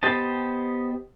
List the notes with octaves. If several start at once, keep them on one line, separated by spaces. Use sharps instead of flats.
B3 G4 C5 D#5 A5